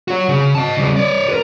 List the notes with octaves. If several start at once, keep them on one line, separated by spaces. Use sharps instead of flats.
F#4 C#5
C#3
D#5 A5
C#3 G3
C#5 D5
A#4 B4